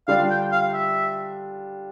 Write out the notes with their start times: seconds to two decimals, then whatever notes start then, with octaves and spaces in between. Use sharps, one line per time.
0.08 D3 G3 D4 F4 F5
0.30 G5
0.52 F5
0.73 E5